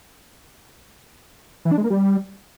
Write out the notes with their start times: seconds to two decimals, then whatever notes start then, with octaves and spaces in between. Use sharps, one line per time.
1.65 E3
1.71 D4
1.78 G#3
1.84 A#3
1.90 G3